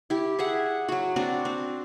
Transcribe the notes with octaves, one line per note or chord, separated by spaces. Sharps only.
E4 G4
G#4 E5 F#5
F#3 F#4
C4 D4 F#4
C4